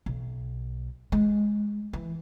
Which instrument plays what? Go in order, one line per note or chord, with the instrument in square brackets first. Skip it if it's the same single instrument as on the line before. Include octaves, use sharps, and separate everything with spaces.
[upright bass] B1
G#3
E3